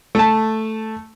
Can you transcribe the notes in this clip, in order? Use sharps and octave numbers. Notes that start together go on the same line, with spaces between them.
A3 A5